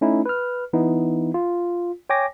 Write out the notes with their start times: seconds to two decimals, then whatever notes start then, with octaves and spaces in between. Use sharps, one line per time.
0.01 A3 C#4 D#4 E4
0.26 B4 F6
0.73 E3 B3 D#4 E4
1.34 F4
2.10 C#5 G5 G#5 D6 A#6